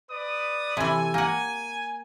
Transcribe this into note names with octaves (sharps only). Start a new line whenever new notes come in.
B4 D5 D#6
C3 E3 A4 G#5
A#3 F#5 G#5